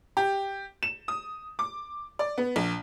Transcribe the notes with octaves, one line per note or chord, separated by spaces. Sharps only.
G4
E7
D#6
D6
D5
B3
A#1